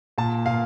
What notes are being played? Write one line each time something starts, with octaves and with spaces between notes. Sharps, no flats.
A#2 A5
A#2 F5